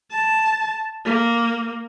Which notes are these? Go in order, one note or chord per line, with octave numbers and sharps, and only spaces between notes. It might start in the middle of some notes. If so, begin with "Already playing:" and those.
A5
A#3